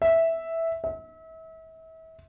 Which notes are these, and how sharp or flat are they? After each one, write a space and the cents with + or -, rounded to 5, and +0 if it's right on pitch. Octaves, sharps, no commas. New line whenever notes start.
E5 -5
E5 -35